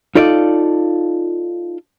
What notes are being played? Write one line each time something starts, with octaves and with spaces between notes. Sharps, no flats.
D#4 F4 A4 D5